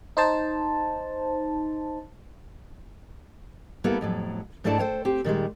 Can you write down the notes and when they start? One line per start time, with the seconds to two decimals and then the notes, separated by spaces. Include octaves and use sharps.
0.17 D#4 C5 A5
3.84 G3 A#3 B3 E4 A4
4.01 F2 A2 F#3
4.64 G#2 A3 D4 E4 A4 D5
4.78 A4 C5 C#5 G5
5.05 C4 G4
5.24 A#2 D#3 G3 G#3